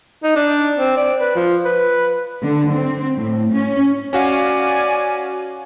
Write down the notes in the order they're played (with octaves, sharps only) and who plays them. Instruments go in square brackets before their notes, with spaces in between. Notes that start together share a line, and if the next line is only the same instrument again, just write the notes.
[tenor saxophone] D#4
D4
C4
D5
B4
F3
B4
[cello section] D3
C4
A2
C#4
[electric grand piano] C#4 F#4 F5 [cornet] D5 [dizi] G#5